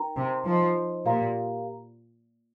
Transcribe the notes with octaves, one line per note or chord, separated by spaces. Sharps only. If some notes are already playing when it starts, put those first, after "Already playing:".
Already playing: D#4 A#4 G5 A#5
C3
F3 D#4 C5 D#5
A#2 G4 A#4 F5 A#5